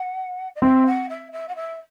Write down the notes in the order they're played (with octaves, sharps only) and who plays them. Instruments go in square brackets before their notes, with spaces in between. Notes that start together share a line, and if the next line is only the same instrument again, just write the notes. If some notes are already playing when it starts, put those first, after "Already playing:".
Already playing: [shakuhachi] F#5
D#5
[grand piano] C4 [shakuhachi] E5
[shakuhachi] F#5
E5
E5
F#5
E5